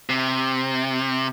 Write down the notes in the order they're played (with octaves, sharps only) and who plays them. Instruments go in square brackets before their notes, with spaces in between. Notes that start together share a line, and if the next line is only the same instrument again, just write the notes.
[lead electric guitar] C3